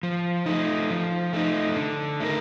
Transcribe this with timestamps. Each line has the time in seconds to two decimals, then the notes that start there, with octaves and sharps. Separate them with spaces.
0.03 F3
0.46 A3 D#4
0.90 F3
1.33 A3 D#4
1.76 D3
2.20 A3 D#4 A#4